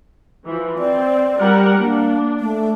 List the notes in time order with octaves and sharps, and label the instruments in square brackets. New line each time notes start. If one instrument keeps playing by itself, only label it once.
[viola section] E3 F3
[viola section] C4 [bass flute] D5
[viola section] G3 A#4 F#5
[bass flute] A#3 [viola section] D4
[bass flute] A3